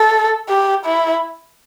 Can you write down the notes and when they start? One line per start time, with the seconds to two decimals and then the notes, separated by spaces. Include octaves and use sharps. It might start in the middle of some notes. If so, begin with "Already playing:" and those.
Already playing: A4
0.49 G4
0.86 E4